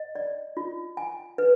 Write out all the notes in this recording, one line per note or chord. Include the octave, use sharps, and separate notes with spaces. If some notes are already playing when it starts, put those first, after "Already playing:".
Already playing: D#5
D5
F4
G#5
B4